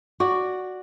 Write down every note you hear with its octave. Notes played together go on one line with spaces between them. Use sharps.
F#4 D5